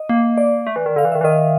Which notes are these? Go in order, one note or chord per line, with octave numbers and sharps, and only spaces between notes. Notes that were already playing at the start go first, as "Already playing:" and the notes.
Already playing: D#5
A#3
D5
A3
E3
D#3
D3 F5
E3
D#3 E5
E3
D#3 D#5